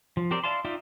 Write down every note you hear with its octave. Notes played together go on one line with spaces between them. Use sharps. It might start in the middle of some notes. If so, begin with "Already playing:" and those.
F3
C4 G4 A#4 C5 D5
E4 D5 F5 A5 C6
D#4 F4 D5 E5 G5